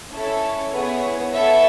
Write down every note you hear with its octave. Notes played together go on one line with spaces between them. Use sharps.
C#4 E4 A4 C#5
B3 E4 G#4
B3 E4 A4 C#5 E5